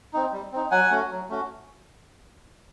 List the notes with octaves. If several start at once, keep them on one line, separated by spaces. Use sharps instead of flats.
C4 D#4
G3
C4 D#4
F#3 F#5 G#5
A3 C#4 F#4
F#3
A3 C#4 F#4